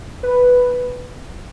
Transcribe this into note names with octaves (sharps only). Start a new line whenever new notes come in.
B4